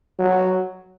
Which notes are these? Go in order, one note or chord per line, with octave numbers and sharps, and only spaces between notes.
F#3